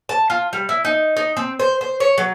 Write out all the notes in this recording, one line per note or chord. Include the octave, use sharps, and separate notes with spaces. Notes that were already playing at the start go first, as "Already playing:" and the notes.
A5
F4
G3
E4
D#4
D#4
C4
C5
C5
C#5
F#3